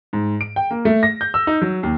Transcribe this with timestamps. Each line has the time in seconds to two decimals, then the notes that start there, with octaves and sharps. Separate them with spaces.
0.13 G#2
0.41 D7
0.56 G5
0.71 A#3
0.85 A3
1.03 A#6
1.21 G6
1.34 E6
1.47 D#4
1.62 F#3
1.83 D#2